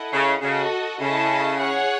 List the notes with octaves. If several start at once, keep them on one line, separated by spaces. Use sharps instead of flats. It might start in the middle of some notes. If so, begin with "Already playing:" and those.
Already playing: E4 A4 D#5 F#5
C#3
C#3 F#4 A4 D#5
C#3 E4 A4 D#5 A5
G#4 C#5 F#5